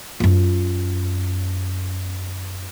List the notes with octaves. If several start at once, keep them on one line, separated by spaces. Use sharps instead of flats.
F#2 F4